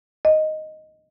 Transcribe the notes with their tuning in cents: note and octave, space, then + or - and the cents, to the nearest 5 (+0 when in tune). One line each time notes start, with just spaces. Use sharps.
D#5 +0